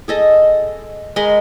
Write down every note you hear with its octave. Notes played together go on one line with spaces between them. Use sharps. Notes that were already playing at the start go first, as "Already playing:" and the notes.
G#4 A4 D#5
G#3 A#4 B5 C6